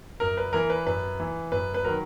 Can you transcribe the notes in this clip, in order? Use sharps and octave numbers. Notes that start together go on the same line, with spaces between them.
F#2 A#4
B4
E3 A#4
B4
F#2 B4
E3
F#2 B4
B4
D#3 F#3 A#4